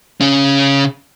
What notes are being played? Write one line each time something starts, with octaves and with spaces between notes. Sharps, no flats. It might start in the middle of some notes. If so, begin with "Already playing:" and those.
C#3 C#4